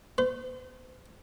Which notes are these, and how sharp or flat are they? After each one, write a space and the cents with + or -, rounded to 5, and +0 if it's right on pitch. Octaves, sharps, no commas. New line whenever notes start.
C5 -40